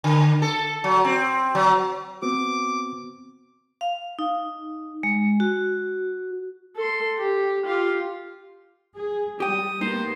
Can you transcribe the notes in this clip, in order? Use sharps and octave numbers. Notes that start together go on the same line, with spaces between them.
D3
A4
F#3
C4
F#3
B3 C4 F#4 D6
F5
D#4
G#3
F#4
A4 C6
G4
F4 G4
G#4
G3 G4 G5 D#6
A#3 B3 D#4 G4 C5